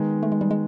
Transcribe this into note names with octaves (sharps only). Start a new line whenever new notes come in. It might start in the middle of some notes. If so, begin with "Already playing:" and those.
Already playing: D#3 G#3 B3 D#4
A3
G#3
G3
G#3